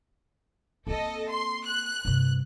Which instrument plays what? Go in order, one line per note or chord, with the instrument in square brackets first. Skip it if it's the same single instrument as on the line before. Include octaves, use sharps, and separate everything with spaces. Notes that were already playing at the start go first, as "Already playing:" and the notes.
[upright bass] A#3 C4 [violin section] A4 D#5
[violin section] C6
F#6
[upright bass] G2 C3